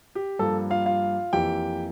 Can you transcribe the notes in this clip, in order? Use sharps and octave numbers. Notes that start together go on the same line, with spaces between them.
G4
G2 F3 A#3 A4
F4 F5
F4 F5
F2 E3 A#3 G4 G5